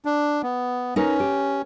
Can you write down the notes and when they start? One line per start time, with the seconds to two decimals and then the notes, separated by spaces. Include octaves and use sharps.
0.05 D4
0.43 B3
0.96 C#4 D#4 A#4 B4
1.20 G4